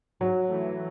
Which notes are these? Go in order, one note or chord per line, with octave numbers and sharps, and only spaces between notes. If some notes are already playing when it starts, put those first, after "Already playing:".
G#2 F#3
E3 A3